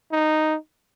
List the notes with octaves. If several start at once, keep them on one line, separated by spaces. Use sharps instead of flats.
D#4